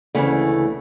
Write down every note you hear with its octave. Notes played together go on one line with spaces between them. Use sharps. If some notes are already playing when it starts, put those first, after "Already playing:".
D2 C#3 E3 A3